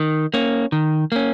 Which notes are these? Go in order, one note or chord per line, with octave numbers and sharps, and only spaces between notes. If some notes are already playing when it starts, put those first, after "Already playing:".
Already playing: D#3
A#3 C#4
D#3
A#3 C#4